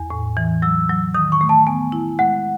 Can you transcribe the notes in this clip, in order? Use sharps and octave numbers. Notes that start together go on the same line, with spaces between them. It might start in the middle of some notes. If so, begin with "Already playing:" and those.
Already playing: E2 G#5
A2
E3
F#3 E6
F#3
D#3 D#6
C#6
A3
A5
B3 G#5
E4
G#3 F#5